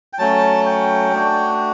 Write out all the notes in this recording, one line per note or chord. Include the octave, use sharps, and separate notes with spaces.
G5
F#3 A3 C#4 A5
G5
A3 D4 F#4